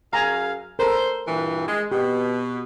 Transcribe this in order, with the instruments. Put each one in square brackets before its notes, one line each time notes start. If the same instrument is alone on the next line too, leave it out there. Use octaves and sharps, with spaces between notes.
[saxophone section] F#2 G#4 F5 [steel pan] G#5 A#5
[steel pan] A4 A#4 [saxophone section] C5
[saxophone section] G2 A#2 E3
G#3
[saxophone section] B2 [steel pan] G4